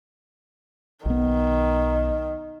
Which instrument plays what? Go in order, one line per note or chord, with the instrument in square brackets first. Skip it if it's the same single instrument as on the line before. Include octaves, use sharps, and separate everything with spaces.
[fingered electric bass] B1 B3 [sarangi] D#3